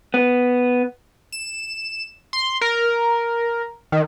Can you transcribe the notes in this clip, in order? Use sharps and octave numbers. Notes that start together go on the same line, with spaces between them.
B3
E7
C6
A#4
D#3